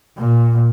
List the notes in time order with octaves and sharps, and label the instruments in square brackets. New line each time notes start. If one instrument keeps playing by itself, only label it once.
[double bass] A#2